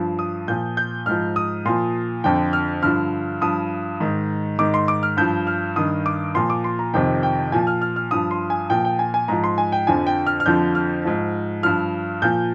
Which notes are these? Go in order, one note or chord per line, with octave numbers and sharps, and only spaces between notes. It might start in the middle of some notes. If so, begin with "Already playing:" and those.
Already playing: G2 F3
D#6
A#2 F3 G6
G6
G#2 F3 F6
D#6
A#2 F3 C6
F2 D3 F3 G5
F6
G2 D3 F3 F6
G2 F3 D#6
G#2 D#3
G#2 D#3 D6
C6
D6
F6
G2 F3 G6
F6
G2 D#3 D#6
D6
A#2 F3 C6
D6
C6
A#5
F2 C3 D#3 G5
G5
A#2 F3 G#5
F6
F6
F6
G2 F3 D#6
C6
G#5
A#2 F3 G5
G5
G#5
G#5
G#2 F3 A#5
C6
G#5
G5
F2 D3 F3 G#5
G5
F6
F6
F2 D3 F3 G6
F6
G#2 F3
G2 F3 F6
A#2 F3 G6